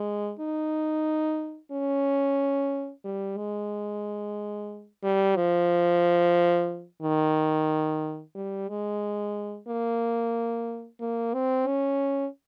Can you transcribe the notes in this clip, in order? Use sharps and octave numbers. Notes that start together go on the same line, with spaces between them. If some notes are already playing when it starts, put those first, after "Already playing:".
Already playing: G#3
D#4
C#4
G3
G#3
G3
F3
D#3
G3
G#3
A#3
A#3
C4
C#4